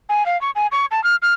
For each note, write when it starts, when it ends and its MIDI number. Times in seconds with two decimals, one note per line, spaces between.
0.09 0.26 80
0.26 0.39 77
0.41 0.51 85
0.55 0.67 80
0.72 0.86 85
0.91 1.03 81
1.04 1.16 89
1.22 1.34 89